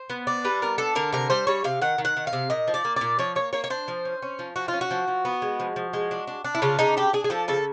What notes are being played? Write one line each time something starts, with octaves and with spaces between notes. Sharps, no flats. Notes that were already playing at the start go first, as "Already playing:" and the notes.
Already playing: C5
B3
D4
G3 B4
B3 A#4
D4 A4
D3 A#4
C3 A#4
G3 C5
G3 C#5
C3 F5
D#3 F#5
D#3
F#5
D#3
F5
C3
A#2 D#5
F3
D5
A#3
A#2 D5
F3 C#5
A#3 C#5
A#3 C#5
C#5
D4 C5
F3
C#4
C#4
F3
F3 F#4
C#4 F4
F#4
F3
F3
B3
G#3
F3
F3
G#3
D4
D4
D4
E4
C#3 F4
C#3 D#4
D4 G4
D4 G#4
G#4
F3 A4
C#3 A4